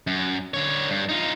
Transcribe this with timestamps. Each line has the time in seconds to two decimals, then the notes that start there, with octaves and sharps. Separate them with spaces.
0.07 F#2
0.54 D3 C#5
0.90 G2
1.09 D#4 F4